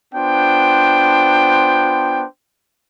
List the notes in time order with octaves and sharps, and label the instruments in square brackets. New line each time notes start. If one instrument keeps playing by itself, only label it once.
[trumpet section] B3 D4 F4 C5 G5